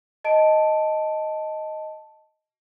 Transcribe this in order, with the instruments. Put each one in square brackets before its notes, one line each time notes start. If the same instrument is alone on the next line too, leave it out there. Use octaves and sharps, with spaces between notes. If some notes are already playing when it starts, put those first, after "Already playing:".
[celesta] D#5 A5 D7